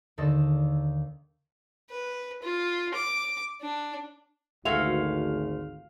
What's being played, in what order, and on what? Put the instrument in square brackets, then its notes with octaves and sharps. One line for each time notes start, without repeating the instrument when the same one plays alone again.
[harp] D#2 D3 A4 D#5 E6
[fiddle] B4
F4
D6
D4
[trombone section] G#1 D2 [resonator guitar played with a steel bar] G#3 A3 F#4 [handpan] F5 [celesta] F7